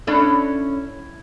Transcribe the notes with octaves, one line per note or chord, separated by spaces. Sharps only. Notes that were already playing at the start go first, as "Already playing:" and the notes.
C#4 D4 E4 A4